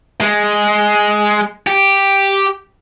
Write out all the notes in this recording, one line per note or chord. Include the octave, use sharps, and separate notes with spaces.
G#3
G4